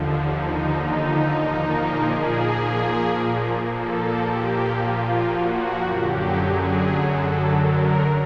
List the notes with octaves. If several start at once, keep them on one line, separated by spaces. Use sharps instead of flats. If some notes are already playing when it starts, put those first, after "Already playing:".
Already playing: D#2 D3 F3
D#4
D#4
A#2 F3 A#3
G#4
A#2 F3 A#3 A4
G4
F4
F#4
F#2 D3 F#3 G4
G#4
A4
A#4